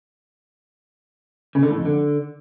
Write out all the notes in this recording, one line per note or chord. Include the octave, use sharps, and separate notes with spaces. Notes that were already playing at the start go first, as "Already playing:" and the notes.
C#3
D3
A2
F2
D3